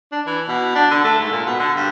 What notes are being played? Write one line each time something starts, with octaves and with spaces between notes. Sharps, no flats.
D4
E3
B2
D4
D3
A3
G#2
A#2
B2
D3
G2